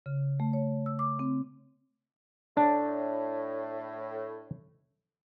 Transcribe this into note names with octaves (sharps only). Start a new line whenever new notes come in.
C#3
A3
C#5
E6
D6
C4
A2 D4 A5